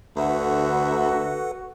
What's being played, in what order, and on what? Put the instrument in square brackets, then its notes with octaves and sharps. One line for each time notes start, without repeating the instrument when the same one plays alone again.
[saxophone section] D2 D3 E5 [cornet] F#4 [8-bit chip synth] A4 B4 F#5